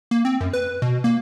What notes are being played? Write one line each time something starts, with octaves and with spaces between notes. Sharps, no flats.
A#3
C4
F#2
B4
B2
A#3